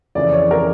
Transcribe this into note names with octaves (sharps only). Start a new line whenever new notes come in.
F2 C#3 E3 D5
C#5
A#4